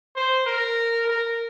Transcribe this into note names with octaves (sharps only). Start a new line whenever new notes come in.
C5
A#4
A#4